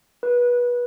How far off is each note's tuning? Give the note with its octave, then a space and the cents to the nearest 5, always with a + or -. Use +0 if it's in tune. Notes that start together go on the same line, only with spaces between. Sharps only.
B4 -25